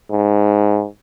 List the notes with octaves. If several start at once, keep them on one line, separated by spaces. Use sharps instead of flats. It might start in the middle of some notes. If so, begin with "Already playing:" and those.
G#2